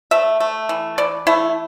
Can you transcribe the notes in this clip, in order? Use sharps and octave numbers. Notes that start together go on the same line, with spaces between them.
A3 E5
A3
E3
E3 D5
A3 E4